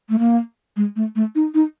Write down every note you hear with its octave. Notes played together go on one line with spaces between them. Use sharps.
A3
A#3
G#3
A3
A3
D#4
D#4